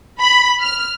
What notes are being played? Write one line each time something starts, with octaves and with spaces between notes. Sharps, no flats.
B5
F6